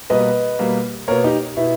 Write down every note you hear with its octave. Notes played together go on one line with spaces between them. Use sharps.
B2 G3 A#3 B4 D#5
B2 G3 A#3
B2 A#3 A#4 C#5
D#4 G4
B2 E4